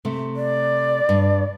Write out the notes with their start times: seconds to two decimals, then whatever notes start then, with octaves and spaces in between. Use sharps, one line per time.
0.05 C3 A3
0.36 D5
1.09 G2